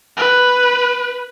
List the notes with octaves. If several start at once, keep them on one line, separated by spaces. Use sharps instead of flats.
B4